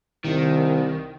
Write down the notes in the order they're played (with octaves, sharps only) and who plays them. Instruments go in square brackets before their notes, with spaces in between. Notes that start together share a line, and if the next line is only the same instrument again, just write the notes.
[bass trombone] C2 [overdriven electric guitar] D#3